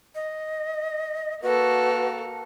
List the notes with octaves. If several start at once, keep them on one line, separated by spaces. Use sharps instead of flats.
D#5
A#3 F#4 A4 B4